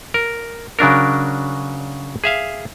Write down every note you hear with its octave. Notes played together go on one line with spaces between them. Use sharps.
A#4
C#3 F#3 D4 A#4
G#4 E5 F5